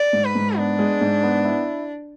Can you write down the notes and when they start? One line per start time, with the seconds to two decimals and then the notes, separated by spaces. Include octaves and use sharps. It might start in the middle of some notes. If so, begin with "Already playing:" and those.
Already playing: D5
0.13 G#2
0.24 B4
0.35 G#2
0.57 B3 D4
0.79 G#3
1.01 G#2
1.23 B3
1.45 E4